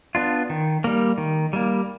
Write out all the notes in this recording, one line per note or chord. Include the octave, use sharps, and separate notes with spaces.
B3 D4 F4
D#3
G3 A#3
D#3
G3 A#3